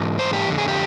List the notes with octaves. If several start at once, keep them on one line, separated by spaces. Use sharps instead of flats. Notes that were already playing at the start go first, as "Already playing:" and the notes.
Already playing: G#2 E3
C5
G4
F2 D3
G#4
G4